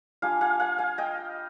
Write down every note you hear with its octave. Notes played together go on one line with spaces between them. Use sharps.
G3 D4 F4 F5 G#5
F5 G#5
F5 G#5
F5 G#5
D#5 G5